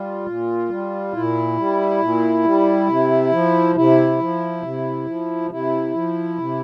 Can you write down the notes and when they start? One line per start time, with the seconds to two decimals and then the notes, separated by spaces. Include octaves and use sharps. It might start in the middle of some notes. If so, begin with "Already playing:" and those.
Already playing: G3 F4
0.26 A#2
0.69 G3
1.13 A#2 E4
1.57 G3
2.01 A#2
2.44 G3
2.88 C3
3.32 F3
3.75 C3 E4
4.19 F3
4.62 C3
5.06 F3
5.50 C3 E4
5.94 F3
6.38 C3